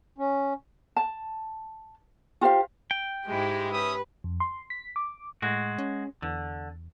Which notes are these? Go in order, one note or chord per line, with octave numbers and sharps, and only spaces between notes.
C#4
A5
F4 G4 C5 F5
G5
G#2 G#3 E4 G4
C#4 B4 E5 D#6
F2
C6
B6
D6
A2 G#3 F#4
C#4
E2 D3